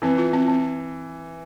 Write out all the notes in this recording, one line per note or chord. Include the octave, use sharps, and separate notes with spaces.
E3 C4
F4
C4
C4